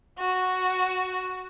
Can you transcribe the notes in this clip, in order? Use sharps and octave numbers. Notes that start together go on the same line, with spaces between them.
F#4